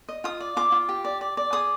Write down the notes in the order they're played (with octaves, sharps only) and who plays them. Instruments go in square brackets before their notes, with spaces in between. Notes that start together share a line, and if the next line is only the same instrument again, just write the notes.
[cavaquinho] D#5
F4 D#6
D5
F4 D6
F4
G4
D5
D5
D5
G#4 D#6